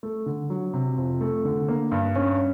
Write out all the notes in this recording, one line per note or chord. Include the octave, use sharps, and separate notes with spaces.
A3
D3
F#3
C3
F2
A3
D3
A#3
G2
C#4